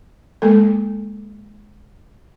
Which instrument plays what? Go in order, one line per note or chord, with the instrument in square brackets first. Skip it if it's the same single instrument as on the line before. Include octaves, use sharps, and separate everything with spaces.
[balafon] G#3 A#3 A4